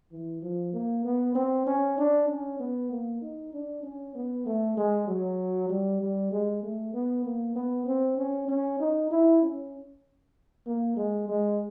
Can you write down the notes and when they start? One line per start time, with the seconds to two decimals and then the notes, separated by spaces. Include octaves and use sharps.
0.12 E3
0.42 F3
0.74 A#3
1.05 B3
1.35 C4
1.67 C#4
1.98 D4
2.29 C#4
2.60 B3
2.91 A#3
3.21 D#4
3.53 D4
3.83 C#4
4.15 B3
4.46 A3
4.77 G#3
5.08 F#3
5.69 G3
6.01 G3
6.32 G#3
6.63 A3
6.94 B3
7.25 A#3
7.56 B3
7.87 C4
8.18 C#4
8.49 C#4
8.80 D#4
9.11 E4
9.42 C#4
10.67 A#3
10.97 G#3
11.29 G#3